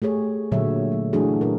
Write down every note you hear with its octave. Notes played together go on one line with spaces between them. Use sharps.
A3 G4 G#4 C#5
A#2 D3 F#3 C#5 E5
A3
E3 F#3 A3 D4 F#4 G#4
A#2 C#4 A#4